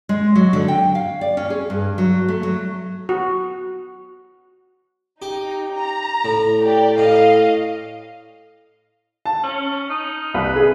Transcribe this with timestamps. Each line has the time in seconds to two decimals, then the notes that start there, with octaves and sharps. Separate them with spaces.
0.09 G#3
0.35 F#3
0.53 D3
0.68 G5
0.95 F5
1.21 D5
1.37 C#4
1.50 G#4
1.70 G2
1.98 F#3
2.28 A3
2.43 F#3
3.09 F#4
5.22 D#4 G4
5.76 A#5
6.25 A2
6.62 G4 D5
6.98 A2 D#5 F5
9.25 A5
9.44 C#4
9.90 D#4
10.34 C2 B4
10.56 G#4